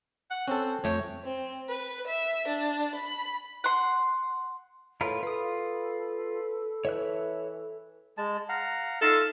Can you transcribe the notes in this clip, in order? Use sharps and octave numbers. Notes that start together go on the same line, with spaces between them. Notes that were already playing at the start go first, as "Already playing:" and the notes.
F#5
C4 C#4 A4
F2 A3 C#5 G5
C4
B4
E5
D4
B5
F#5 C6
A2 F4 A#4 B4
F4 A4 B4 D#6
E3 C#5 E5 F#6
G#3 A5
F5 F#5 A#5
D#4 F4 A4 E5